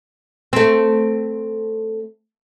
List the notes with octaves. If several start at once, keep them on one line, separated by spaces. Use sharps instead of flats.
A3 C4